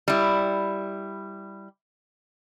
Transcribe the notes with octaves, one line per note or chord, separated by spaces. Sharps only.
G3 E4